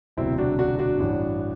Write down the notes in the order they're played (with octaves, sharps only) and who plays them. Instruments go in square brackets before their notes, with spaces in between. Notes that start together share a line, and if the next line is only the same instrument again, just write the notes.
[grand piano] E1 D2 C3 F#3 C4 E4
D4 F#4
D4 F#4
D4 F#4
A1 G2 E3